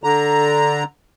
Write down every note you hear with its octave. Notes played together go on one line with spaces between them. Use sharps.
D3 A#5